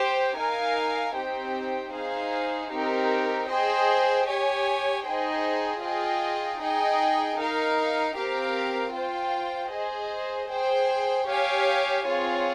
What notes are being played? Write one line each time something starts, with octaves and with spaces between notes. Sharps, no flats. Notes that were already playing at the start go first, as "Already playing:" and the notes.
Already playing: G4 C5 G5
D#4 A#4 F5 G#5
C4 D#4 G4 C5 G5
D#4 G#4 C5 F5
C4 D#4 G4 A#4
G#4 C5 D#5 G5
G4 C#5 G#5
D#4 G#4 C5 D#5 G5
F4 G#4 D#5 G5
D#4 G#4 D#5 G5
D#4 A#4 F5
C4 G4 A#4 F5
F4 C5 G5
G#4 C5 D#5
G#4 C5 G5
G4 C#5 F5 G#5
C4 F4 G#4 C#5